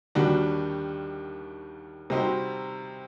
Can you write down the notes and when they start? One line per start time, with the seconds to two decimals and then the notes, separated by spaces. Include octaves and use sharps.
0.15 D#2 D#3 G3 D4 F#4
2.10 C3 G3 C4 D#4 F#4